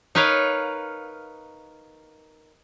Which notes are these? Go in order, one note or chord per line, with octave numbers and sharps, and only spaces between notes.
D#4 A#4 B4 C#5 F5